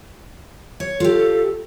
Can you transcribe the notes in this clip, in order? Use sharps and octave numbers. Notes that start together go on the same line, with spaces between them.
C#5
F4 G4 A4